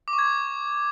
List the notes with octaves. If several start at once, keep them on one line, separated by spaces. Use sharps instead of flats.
D6
C#6
G#6